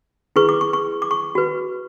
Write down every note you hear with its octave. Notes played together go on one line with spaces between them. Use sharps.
E4 G#4 B4 C#6
D6
C#6
C#6
D6
C#6
F#4 B4